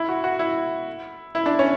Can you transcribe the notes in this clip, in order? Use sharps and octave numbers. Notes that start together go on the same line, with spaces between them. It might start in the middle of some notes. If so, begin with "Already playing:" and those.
Already playing: E4
F#4
F#4
E4
E4
D4
C#4